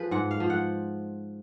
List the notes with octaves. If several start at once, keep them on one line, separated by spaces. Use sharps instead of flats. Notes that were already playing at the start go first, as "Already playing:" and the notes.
Already playing: F3 G#4 B4
G#2 F#5
F5
F3
F#5